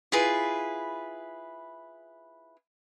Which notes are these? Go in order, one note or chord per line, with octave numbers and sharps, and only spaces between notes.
E4 F4 G#4 B4